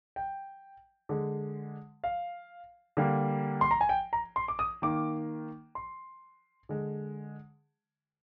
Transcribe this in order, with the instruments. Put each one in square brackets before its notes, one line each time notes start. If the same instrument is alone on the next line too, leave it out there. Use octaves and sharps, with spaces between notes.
[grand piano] G5
D3 G#3
F5
D3 G3 A#3
C6
A#5
G#5
G5
A#5
C6
D6
D#6
D#3 A#3 D6
C6
D3 G#3